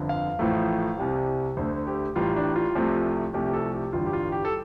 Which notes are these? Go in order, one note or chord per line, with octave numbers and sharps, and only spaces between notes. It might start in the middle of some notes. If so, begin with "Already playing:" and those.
Already playing: G1 F2 D3
F5
A1 A2 F3 A3
C2 C3 G3
D2 D3 A3 C5
G4
A1 A2 G3 F4
D4
F4
C2 C3 F3 A3
C2 C3 F3 A3 G4
G4
A4
G4
A1 G2 D3 G3 F4
G4
F4
G4
A4